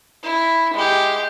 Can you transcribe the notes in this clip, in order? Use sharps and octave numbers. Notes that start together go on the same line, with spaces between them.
E4
G#3 G4